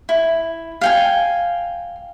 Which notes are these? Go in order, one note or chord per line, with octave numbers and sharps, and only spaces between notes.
E4
F5 G5 G#5